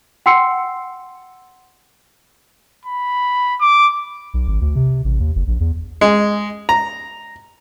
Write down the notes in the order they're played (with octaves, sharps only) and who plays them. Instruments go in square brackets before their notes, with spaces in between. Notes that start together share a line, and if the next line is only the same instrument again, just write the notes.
[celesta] F#5 G5 C6 E6 C7 C#7
[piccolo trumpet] B5
D6
[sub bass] B1
G#1
D2
C3
A1
D#2
F#1
A#1
E2
[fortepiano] G#3
A#5